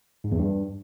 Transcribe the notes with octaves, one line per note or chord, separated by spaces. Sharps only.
G#2
E2
G2